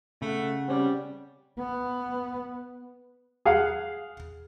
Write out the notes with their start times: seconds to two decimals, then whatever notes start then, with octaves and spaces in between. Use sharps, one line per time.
0.22 C#3 A3 F#5
0.68 G3 C4 C#4 D5
1.58 B3
3.46 G#4 F5 F#5